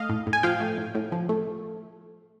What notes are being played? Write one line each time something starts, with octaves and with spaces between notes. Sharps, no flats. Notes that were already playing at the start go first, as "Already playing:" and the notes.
Already playing: A3 D#5 F5
A2
A2
G#5
F3 F5 G5
A3
A2
A2
F3
A3